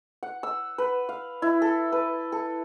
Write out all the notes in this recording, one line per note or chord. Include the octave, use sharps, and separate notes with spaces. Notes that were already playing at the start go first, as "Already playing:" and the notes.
F#5
E6
B4
F5
E4
A4
B4
A4